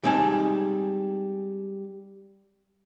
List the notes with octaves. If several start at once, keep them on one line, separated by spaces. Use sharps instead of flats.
G3 G#3 C4 D#4 G#5 A5